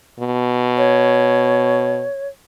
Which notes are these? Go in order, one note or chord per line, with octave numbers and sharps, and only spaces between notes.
B2
C#5